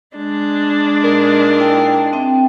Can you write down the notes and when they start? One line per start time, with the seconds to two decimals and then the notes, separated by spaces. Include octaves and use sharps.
0.17 G#3 D4
1.03 A#2 D#4 A#4
1.58 E4 G5 A5
2.13 C4 E5 G5